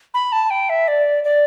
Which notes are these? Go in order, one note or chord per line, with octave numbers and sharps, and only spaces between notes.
B5
A5
G5
E5
D5
D5